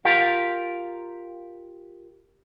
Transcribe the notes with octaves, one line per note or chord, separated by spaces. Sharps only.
F4 G4 A#4 F5